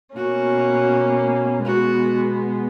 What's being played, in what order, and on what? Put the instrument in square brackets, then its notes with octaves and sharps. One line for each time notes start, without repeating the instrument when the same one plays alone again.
[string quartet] B2 A#3 C#4 [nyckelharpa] F#4
[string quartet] B2 G#3 B3 [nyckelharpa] F#4